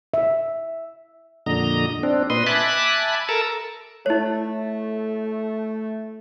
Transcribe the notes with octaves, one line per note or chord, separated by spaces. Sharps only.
E5
F2 A#2 D3 D#5 A#5
C4 D4
A#2 B4 D#5 C6
E5 G#5 A5 B5 D6 F#6
A4 A#4 A5 A#5 E6
A3 E4 C#5